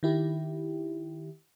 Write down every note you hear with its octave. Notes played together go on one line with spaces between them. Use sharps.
D#3 E4 G4